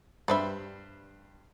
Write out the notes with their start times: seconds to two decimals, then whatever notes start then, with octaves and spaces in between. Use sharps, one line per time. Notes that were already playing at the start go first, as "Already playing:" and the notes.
0.28 G2 G3 B4 C5 E5 B5